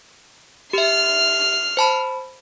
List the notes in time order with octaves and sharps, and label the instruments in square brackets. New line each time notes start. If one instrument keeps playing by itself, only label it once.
[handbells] G4 E5 [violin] F6 C7
[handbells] C5 A5 B5